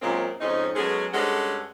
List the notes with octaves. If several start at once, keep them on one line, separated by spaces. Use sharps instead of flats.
F#2 A#2 G#3 A#3 C4 C#4
F2 G#2 C4 C#4 D#4
F#3 G#3 B3 C#4 G#4 A4
G2 G#3 C#4 A4 F#5